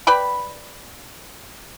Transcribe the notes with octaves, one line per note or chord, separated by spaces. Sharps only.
B4 D5 G5 B5